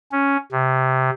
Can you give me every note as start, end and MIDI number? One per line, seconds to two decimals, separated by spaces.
0.12 0.37 61
0.52 1.10 48